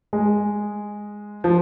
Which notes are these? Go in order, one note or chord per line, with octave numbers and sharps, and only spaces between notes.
G#3
F3